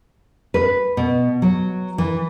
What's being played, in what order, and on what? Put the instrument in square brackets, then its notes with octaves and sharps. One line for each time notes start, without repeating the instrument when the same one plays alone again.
[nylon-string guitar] B4
B2
F#3
E3